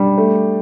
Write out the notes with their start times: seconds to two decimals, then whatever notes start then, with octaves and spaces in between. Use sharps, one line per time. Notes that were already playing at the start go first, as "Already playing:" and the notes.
Already playing: G3 D4
0.18 A3